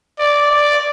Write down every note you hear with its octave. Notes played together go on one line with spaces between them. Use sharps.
D5
D5